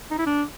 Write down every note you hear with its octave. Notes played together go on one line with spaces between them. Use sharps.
D#4
E4
D4